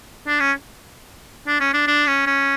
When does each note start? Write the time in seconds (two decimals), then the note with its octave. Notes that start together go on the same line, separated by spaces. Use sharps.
0.27 D4
0.40 C#4
1.47 D4
1.60 C#4
1.74 D4
1.87 D4
2.07 C#4
2.27 C#4